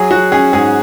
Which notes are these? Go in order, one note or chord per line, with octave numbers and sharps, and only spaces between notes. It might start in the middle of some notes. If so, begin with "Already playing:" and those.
Already playing: F#3 G#4
F#3 F#4
C#4 G#4
G#2 G#4